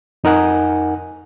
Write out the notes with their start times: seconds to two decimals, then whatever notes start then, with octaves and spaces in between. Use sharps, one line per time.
0.24 F2 D#4 A#4 F#5 G#5